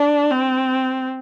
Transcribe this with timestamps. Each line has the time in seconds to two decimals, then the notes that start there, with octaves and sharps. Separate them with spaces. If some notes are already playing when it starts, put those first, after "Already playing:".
Already playing: D4
0.30 C4